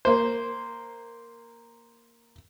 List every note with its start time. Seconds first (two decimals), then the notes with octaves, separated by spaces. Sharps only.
0.05 A#3 C5